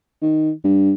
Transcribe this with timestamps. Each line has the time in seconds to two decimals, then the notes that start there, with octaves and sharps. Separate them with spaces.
0.22 D#3
0.64 G2